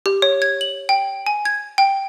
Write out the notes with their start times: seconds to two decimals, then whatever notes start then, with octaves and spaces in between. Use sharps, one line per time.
0.06 G4
0.22 C#5
0.42 G#6
0.61 F#7
0.89 G5
1.26 G#5
1.45 G#6
1.78 G5